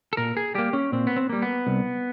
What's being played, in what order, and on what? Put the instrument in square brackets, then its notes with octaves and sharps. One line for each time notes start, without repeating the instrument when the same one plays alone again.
[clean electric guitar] A4
A#2 A#4
G#4
G3 A#3 G4
C#4
A#2 C4
B3
C4
G3 A#3
B3
C2